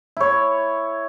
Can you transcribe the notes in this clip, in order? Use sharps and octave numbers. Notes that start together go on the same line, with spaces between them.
E4 C#5